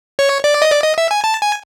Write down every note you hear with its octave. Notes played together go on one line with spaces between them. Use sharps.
C#5
D5
D#5
D5
D#5
E5
G#5
A5
G#5